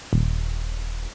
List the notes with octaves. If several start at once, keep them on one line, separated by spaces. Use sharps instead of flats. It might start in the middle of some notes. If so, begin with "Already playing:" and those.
D#1